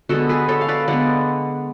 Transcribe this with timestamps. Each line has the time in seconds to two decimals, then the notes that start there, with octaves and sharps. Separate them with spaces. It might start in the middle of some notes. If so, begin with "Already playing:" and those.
0.09 D3 G#3 B3 F#4 A4
0.29 G#4 B4
0.49 A4 C#5
0.61 F5
0.68 B4 D5
0.87 D3 G#3 B3 D5 F#5